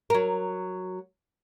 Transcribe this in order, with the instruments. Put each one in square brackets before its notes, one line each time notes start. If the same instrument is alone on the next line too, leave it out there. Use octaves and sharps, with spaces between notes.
[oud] F#3 A#4